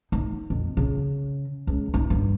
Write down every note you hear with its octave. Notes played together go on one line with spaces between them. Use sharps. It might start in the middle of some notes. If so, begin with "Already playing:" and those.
D#4
F2
C#3
C#2
D#4
G2